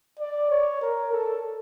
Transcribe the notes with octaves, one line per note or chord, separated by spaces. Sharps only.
D5
C#5
A#4
A4